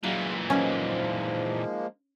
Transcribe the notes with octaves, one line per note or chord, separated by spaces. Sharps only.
A#2 E3 F#3 G#3 F4
F3 F#3 G#3 A#3 C#4 D#4 C5